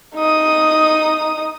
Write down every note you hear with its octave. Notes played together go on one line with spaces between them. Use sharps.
D#4 D#6